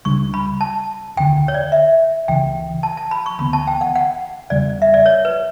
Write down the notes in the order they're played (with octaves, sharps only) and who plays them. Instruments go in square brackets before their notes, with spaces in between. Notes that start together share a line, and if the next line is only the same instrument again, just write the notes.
[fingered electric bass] C#2 C#3 G3 D4 [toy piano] C#6
[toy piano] B5
A5
[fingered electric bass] E1 D2 D3 [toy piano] G5
[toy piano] C#5
D5
E5
[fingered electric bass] C#2 C#3 E3 [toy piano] G5
[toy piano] A5
A5
B5
C#6
[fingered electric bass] D2 C#3 E3 B3 [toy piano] B5
[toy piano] A5
G5
F#5
F#5
[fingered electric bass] E2 C#3 G3 [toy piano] D5
[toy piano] E5
D5
C#5
B4